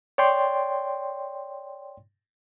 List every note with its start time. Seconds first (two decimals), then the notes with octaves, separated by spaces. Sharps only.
0.18 C#5 D5 G5 C6